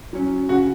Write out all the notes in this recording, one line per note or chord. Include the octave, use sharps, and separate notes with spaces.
F#3 C#4
C#3 F#4